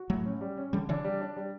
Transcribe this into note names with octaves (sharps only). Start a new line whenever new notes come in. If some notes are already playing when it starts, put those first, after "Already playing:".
Already playing: F#4
A2 F#3 A3
C#4
G3
C#4
D3 E3 G3
C#3 E3 D4
G3
D4
G3